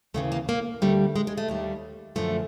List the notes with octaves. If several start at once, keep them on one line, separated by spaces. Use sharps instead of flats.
D#2 C#3 E3 A3
A#3
A#3
D2 D3 G3 A3
G#3
G#3
A3
D#2 D#3 G3
F#2 D3 F3 A3